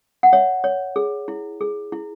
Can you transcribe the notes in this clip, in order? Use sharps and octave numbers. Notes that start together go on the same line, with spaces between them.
F#5
C#5 E5
C#5
G#4
E4
G#4
E4